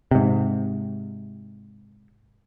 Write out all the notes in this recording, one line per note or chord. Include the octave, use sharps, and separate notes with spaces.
G#2 C3